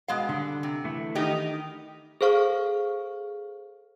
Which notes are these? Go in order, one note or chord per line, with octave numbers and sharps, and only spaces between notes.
B2 G#3 F5
D3 G3
C3
E3 A3 E4
D#3 D#4 G4
G#4 A4 C5 F5 C#6 F6